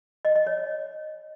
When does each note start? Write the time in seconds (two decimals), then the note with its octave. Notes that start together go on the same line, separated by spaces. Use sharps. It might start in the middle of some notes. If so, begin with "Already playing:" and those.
0.25 D#5
0.36 D#5
0.47 C#5